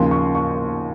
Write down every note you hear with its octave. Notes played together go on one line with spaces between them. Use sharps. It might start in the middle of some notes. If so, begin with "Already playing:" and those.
Already playing: D#2 C#3 F3 C6
C#6
C#6